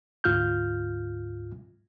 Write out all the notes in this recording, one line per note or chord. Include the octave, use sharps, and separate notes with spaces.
D2 G#2 F4 F6 G6